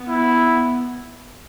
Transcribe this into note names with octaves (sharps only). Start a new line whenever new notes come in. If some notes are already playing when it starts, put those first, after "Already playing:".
Already playing: B3
E4